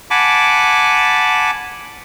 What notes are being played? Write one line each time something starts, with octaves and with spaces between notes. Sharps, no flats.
F#5 G#5 A5 B5 D6